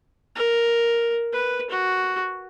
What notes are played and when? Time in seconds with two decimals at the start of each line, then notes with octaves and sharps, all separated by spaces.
0.35 A#4
1.33 B4
1.71 F#4